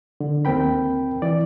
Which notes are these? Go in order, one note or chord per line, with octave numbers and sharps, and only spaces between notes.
D3
D#2 C4 A#4 G5 B5
E3 D5